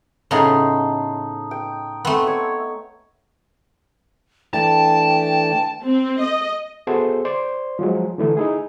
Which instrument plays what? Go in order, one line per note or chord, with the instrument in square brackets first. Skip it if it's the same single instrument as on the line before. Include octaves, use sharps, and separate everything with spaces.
[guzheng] A2 C#3 B3 [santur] D#4 A5 C6
[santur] G5
[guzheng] A3 B3 [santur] C4
[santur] C#5
[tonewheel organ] E3 A3 D4 [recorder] G5 [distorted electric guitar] A5
[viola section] C4
D#5
[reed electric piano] B3 F#4 G#4 A4 C5 E5
C5 D5 C6
F3 F#3 G#3
D3 E3 A3
D#4 E4 G#4